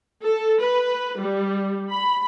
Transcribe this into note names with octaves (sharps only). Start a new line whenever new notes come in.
A4
B4
G3
B5